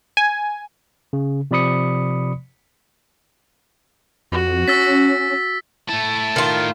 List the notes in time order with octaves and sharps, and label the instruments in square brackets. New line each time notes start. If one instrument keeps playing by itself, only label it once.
[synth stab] G#5
[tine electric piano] C#3
C3 F3 D5 B5 D#6 C#7
[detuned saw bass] F2 [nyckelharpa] F#4
[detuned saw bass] C#4 [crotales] E6 A6 B6
[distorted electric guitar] A3 E4 [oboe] A5
[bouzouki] D#3 F4